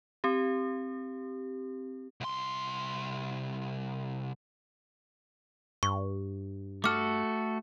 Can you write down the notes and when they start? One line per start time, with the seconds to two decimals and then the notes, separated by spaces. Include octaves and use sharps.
0.24 C4 G4
2.21 C2 C6
5.83 G2 C#6
6.84 A3 F#4 A4 D6 F6